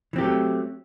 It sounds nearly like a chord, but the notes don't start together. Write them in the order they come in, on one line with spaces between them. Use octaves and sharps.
E3 C4 G4 F#3 A3